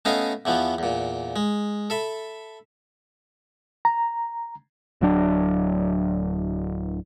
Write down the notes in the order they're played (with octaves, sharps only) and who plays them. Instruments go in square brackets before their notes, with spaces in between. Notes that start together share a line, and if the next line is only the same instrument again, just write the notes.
[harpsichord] A3 B3 C#4 E4 D#5 F5
E2 E3 F3 B3
E2 A#2
G#3
A4 E5 B5
[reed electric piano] A#5
[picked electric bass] D1 F#3 D4